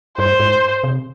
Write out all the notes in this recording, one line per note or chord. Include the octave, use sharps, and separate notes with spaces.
G2 C5
G#2
C3